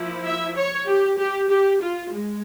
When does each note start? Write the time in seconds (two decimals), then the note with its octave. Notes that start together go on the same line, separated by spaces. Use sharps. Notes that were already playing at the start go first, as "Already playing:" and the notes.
Already playing: F3 A#3 E4
0.24 E5
0.56 C#5
0.86 G4
1.18 G4
1.49 G4
1.81 F4
2.12 G#3